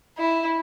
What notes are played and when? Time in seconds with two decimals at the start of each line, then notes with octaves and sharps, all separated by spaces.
0.18 E4